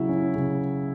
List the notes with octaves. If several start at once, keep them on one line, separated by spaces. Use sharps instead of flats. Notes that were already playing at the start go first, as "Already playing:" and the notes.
Already playing: C#3 F#3 E4
C#4
C#3